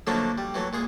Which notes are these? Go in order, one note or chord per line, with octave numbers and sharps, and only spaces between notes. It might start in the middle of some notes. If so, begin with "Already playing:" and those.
D3 F3 F#3 A3 A#3 D4
G3
E3 F#3 A3
A#2 G#3 G#4